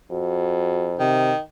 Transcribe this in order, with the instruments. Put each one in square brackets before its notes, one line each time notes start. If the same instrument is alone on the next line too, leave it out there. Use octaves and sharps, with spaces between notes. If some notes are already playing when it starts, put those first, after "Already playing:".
[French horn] F2 [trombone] F#4
[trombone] C3 [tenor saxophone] D#3